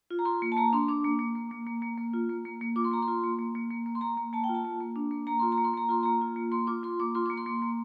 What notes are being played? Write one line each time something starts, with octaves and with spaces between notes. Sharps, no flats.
F4
A#5
F4 C6
A#3
A5
A#3 A#5
D4 C6
D4 D6
A#3
A#3
A#3
A#3
A#3
A#3
A#3
F4
A#3
A#3
A#3
F4 D6
C6
A#3 A#5
C6
F4
A#3
A#3
A#3
A#3
A#3
C6
A#3 A#5
A#3
A#3 A5
G5
F4
A5
A#3
A#3
D4
A#3
A#3 A#5
F4 C6
A#5
A#3
C6
A#3 A#5
F4 C6
A#3 A#5
F4
A#3
A#3 C6
F4 D6
F4 C6
A#3 D6
F4 C6
A#3 D6
C6
A#3
A#3